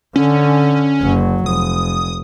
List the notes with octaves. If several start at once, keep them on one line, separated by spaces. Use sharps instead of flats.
D3 C#4
F#1 F#3
F1 D#6